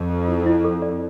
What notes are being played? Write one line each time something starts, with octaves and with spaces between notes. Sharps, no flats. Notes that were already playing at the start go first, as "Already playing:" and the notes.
Already playing: F2
A4
E4
E4
A4
D5